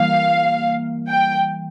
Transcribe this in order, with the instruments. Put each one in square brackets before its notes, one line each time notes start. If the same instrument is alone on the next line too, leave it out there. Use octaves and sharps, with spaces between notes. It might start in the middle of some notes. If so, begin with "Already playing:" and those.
Already playing: [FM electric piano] E3 G3 A#3 [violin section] F5
[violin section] G5